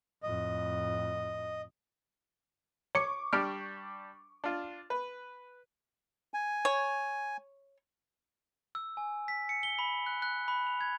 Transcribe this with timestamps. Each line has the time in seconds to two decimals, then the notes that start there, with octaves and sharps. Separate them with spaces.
0.23 F2 A2 D#5
2.95 C#5 C#6 D6 C#7
3.33 G3 D4 G4 F6 D7
4.44 D4 F4
4.90 B4
6.34 G#5
6.65 C#5
8.75 E6
8.97 G#5
9.28 B6
9.49 C#7
9.63 G7
9.79 B5
10.06 F#6
10.22 F#6
10.48 B5
10.67 F7
10.81 G#6